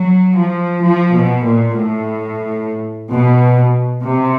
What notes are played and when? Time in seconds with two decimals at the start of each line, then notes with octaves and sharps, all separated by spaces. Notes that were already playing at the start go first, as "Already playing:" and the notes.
Already playing: F#3
0.36 F3
0.82 F3
1.13 B2
1.43 A#2
1.74 A2
3.12 B2
4.04 C3